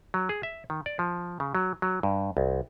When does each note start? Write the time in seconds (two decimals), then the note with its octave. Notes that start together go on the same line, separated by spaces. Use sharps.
0.14 F#3
0.29 G#4
0.43 E5
0.70 D#3
0.86 D5
0.99 F3
1.40 C#3
1.55 F#3
1.82 F#3
2.03 G2
2.37 C2